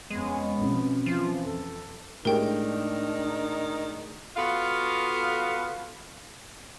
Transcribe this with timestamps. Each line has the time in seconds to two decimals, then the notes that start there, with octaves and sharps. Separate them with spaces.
0.10 F2 G#3 B3 C#4
0.62 B2 F3 C4 C#4
1.06 E3 F3 F4
1.44 F2 A4
2.25 A2 D#3 G#3 D4 G4 A#4 G5
4.36 B3 F4 F#4 A4 F5